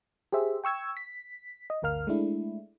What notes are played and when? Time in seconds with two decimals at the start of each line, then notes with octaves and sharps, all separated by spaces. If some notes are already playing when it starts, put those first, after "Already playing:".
0.32 G4 G#4 C5 E5
0.64 G5 C#6 E6 G#6
0.97 B6
1.70 D#5
1.82 G1 D2 A#4 F5 F6
2.07 G#3 A3 D4 E4